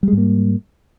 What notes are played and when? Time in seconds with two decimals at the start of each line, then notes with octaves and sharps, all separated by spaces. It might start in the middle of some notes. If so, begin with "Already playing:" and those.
0.03 G3
0.08 G#3
0.13 G#2
0.18 A#3